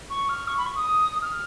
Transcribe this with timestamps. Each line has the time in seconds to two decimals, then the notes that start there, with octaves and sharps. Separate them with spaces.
0.10 C#6
0.29 F6
0.48 C#6
0.58 B5
0.66 C#6
0.76 D#6
1.22 F6